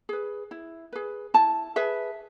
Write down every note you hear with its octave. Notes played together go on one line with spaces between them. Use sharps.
G#4 B4
E4
G#4 B4
E4 A5
G#4 B4 E5